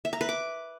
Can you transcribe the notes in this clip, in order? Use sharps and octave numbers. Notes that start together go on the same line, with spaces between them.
E5
A#5
B4
D6